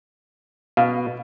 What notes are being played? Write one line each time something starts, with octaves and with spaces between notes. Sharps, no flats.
B2 F5